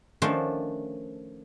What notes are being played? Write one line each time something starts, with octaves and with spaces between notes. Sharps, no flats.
D#3 F3 A3 C#4 D4 C5